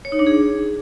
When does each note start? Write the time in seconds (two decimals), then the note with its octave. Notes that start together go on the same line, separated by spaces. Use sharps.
0.05 C#5
0.12 D#4
0.19 D4
0.27 G#4